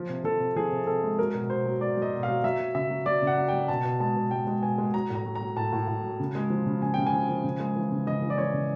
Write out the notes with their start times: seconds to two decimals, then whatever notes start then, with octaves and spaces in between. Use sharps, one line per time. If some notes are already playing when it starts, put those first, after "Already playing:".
Already playing: F3
0.09 C3
0.24 F3 A4
0.40 C3
0.56 F3 G#4
0.72 C3
0.87 C3 A4
1.03 G#3
1.19 F#3 A#4
1.34 B2
1.50 B2 C5
1.66 F#3
1.81 F#3 D5
1.97 F#3 D#5
2.13 B2
2.23 F5
2.28 F#3
2.44 F#3 E5
2.59 F#3
2.75 C#3 E5
2.90 F#3
3.06 F#3 D5
3.22 C#3
3.27 F#5
3.37 F#3
3.48 F#3 G5
3.68 B2 A5
3.84 B2
4.00 G#3 A5
4.16 B2
4.31 G#3 G5
4.47 G#3
4.62 B2 G#5
4.78 G#3
4.94 F#3 A#5
5.10 A2
5.15 A#5
5.25 F#3
5.35 A#5
5.41 F#3
5.56 A2 A5
5.73 A2
5.88 A2
6.04 F#3
6.20 C#3
6.35 G#3
6.50 F3
6.66 C#3
6.82 C#3 G#5
6.94 C#3 G5
7.06 G#5
7.13 F3
7.29 F3
7.44 C#3
7.60 G#3
7.76 E3
7.92 C#3
8.07 C#3 D#5
8.22 E3
8.30 D5
8.38 E3 C#5
8.54 C#3